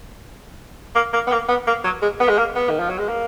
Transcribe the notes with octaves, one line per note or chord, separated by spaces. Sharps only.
A#3
A#3
B3
A#3
B3
A#3
F#3
G#3
B3
G#3
A#3
B3
D#3
F3
F#3
G#3
A#3